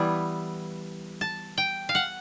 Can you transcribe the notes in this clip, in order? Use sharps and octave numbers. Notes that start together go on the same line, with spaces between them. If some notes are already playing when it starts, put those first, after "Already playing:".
Already playing: E3 G3 B3 E4
A5
G5
F5
F#5